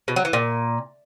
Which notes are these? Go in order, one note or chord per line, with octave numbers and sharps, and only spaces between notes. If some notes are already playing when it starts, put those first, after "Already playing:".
B2
F#3
E3
A#2